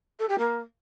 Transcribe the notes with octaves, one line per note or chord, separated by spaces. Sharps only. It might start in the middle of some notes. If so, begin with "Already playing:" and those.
A4
G4
A#3